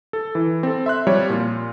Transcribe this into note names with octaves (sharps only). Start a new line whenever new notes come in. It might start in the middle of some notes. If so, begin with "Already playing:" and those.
A4
E3
C4 A4
E5 C6 F#6
F3 G3 C4 C#5
A#2 F4